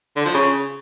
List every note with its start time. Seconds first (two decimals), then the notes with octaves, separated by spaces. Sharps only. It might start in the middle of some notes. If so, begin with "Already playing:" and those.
0.16 D3
0.25 F3
0.34 C#3